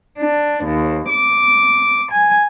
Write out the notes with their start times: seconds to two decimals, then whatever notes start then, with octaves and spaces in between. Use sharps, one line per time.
0.19 D4
0.64 D#2
1.08 D6
2.11 G#5